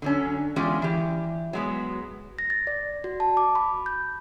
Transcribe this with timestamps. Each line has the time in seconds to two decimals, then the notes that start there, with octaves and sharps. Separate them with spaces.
0.02 D3 F#3 C#4
0.56 E2 G#3 C#4 F4 G4 D5
0.82 E3 G4
1.53 F#3 G#3 B3
2.39 A#6
2.50 A6
2.67 D5
3.04 F#4
3.20 A5
3.37 D6
3.55 B5
3.86 G6